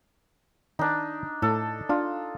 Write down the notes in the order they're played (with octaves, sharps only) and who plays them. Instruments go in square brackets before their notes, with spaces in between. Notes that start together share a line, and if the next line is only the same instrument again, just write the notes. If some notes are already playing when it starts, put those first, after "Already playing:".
[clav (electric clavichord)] D#3 [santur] D4 D#4
[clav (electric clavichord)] A2 [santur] A4
[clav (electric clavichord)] D4 [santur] F4